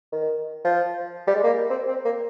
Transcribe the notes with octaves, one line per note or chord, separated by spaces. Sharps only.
D#3
F3
G3
G#3
A#3
C4
C4
A#3